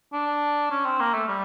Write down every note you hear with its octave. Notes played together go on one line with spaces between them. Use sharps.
D4
C#4
C4
A#3
A3
G3